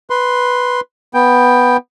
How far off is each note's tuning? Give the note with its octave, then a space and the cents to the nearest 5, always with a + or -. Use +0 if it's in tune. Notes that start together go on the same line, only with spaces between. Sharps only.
B4 +0 C6 +0
B3 +0 G5 +10